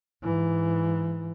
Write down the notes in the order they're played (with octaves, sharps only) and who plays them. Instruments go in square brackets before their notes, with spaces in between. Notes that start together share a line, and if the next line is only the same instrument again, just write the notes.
[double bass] G#2 E3